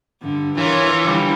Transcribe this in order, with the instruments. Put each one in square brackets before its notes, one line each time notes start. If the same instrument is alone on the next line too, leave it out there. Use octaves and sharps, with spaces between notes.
[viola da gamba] G2 D3
[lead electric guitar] E3 [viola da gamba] F4 A#4 C#5
[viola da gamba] D3 G3